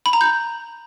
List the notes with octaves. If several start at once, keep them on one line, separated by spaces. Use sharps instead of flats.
B5
A#5
G6